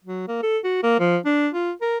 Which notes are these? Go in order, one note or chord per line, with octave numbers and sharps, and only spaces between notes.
F#3
A#3
A4
F#4
A#3
F3
D4
F4
A#4